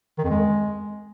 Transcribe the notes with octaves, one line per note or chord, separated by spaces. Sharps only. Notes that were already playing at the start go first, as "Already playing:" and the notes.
D#3
F2
G#3